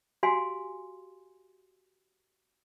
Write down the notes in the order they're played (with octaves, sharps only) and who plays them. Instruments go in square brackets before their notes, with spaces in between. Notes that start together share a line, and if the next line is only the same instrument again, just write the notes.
[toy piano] F#4 G4 F5 G#5 C6